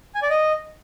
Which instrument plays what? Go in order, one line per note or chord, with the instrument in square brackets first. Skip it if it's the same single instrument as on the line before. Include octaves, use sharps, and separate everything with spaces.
[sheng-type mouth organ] G#5
D5
D#5